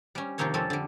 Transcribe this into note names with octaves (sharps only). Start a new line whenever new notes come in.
G3 C#4
C3 D#3 F3 A#3 C4 C#5
F2 G3 C4 C#4 A4
D3 G3